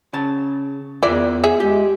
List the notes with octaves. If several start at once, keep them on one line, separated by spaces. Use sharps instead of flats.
C#3 A5
E2 E4 F4 A#4 D5 E5
G#4 E5
G#3 G4